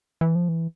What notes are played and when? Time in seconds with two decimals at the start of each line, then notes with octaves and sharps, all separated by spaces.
0.21 E3
0.35 F3
0.49 E3